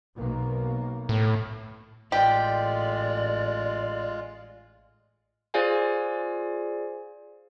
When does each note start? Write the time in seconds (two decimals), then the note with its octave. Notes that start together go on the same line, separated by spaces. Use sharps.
0.16 B1 B2 A#3
1.09 A2
2.12 A1 G#3 F4 G4 D5
5.54 F4 G#4 C5 D5 F5 G#5